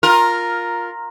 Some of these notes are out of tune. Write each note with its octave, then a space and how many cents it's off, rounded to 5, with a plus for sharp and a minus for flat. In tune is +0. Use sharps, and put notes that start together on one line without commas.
F4 +10 A#4 +0